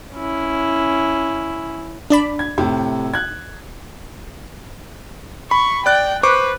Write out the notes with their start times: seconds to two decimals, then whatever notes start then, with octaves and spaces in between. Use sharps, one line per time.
0.15 C#4 E4
2.10 D4 D5 B5
2.39 G#6
2.58 A2 C3
3.14 F#6 G#6
5.51 B5 C#6
5.86 D5 G5 F#6 A6
6.23 B4 C5 C#6 D6